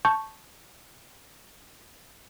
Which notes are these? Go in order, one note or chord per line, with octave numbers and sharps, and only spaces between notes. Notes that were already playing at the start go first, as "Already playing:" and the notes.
A5 C#6 G6